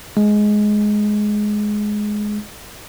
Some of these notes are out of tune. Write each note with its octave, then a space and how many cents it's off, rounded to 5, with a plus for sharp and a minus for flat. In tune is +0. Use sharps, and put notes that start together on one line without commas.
G#3 +10